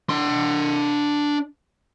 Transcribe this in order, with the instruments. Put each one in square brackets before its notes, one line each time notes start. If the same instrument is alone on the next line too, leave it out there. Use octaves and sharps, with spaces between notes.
[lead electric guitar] D4 C6